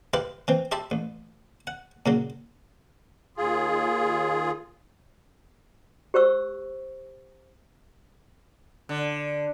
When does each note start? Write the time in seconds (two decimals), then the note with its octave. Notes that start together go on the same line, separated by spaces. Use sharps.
0.13 E4 G4 B4 F5 C6
0.48 E3 C4
0.72 G4 E5 A5 B5 C6
0.91 A1
1.67 F#5
2.06 A#2 C#3 F#3
3.37 D#2 F4 G#4
6.14 G4 C5 C#6 E6
8.89 D3